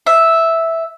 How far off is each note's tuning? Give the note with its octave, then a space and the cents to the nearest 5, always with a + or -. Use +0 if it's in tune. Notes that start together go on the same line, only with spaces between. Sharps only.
E5 -5